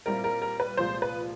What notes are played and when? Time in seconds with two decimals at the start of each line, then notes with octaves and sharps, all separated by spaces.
0.06 A#2 G3 C4 E4 A#4
0.24 A#4
0.42 A#4
0.60 B4
0.77 C2 A#2 F3 G#3 C5
1.02 B4